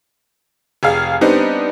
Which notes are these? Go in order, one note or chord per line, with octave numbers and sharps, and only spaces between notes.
F1 G#4 F5
G3 B3 C4 D4 D#4